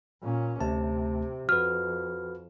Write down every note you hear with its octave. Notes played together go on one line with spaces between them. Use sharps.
A#2 C#4
D2 C3 A3 A5
F2 F#4 B4 F6